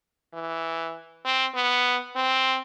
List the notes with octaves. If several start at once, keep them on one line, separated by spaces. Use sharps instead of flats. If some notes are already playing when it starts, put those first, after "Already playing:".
E3
C4
B3
C4